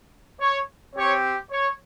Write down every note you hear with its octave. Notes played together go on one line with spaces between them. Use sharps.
C#5
C4 G4 C#5
C#5